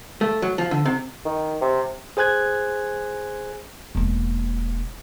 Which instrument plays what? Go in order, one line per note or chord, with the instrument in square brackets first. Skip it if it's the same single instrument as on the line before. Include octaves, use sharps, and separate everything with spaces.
[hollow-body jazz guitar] A3
F#3
F3
D3
C3
[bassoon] D#3
C3
[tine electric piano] G#4 C5 G#5 F#6 G#6
[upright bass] E1 A#3